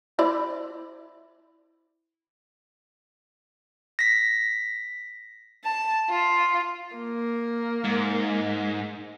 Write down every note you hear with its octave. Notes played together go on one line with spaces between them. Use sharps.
E4 C5 D5
A#6 B6
A5
F4
A#3
G#2